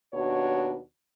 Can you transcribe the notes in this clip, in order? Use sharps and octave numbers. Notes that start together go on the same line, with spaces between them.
D#2 B2 D4 F#4 C#5